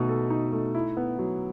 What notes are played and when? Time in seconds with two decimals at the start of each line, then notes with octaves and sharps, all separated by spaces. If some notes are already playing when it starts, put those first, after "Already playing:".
Already playing: B2 A3 D#4
0.09 A4
0.30 D#4
0.53 A3
0.75 E4
0.97 B3
1.19 F#3